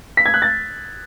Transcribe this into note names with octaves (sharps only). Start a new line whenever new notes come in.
B6
G#6
F#6
A6